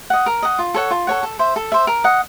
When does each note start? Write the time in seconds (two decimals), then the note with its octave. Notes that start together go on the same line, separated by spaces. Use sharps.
0.10 D#5 F#5
0.26 A#4
0.42 D#5 F#5
0.59 F4
0.74 A4 C#5 F#5
0.91 F4
1.07 A4 C#5 F#5
1.23 A4
1.39 C5 E5
1.56 A4
1.72 C5 E5
1.87 A#4
2.04 D#5 F#5